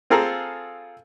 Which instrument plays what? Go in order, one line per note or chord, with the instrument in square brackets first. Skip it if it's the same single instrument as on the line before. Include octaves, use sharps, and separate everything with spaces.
[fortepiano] C4 F4 G#4 A4 F5 A#5